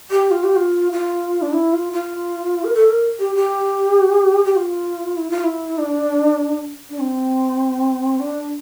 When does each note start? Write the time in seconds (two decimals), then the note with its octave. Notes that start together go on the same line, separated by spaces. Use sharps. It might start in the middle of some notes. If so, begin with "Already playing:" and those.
0.11 G4
0.31 F4
0.44 G4
0.56 F4
0.92 F4
1.42 D4
1.52 E4
1.73 F4
1.93 F4
2.64 A#4
2.75 A4
2.89 A#4
3.19 G4
3.35 G4
4.45 G4
4.56 F4
5.17 E4
5.30 F4
5.44 E4
5.78 D4
6.90 D4
7.00 C4
8.20 D4